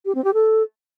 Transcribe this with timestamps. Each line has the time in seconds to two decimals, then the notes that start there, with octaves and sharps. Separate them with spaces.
0.05 G4
0.15 C4
0.24 G4
0.34 A4